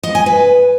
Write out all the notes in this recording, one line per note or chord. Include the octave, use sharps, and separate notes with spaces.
D#5
G#5
B4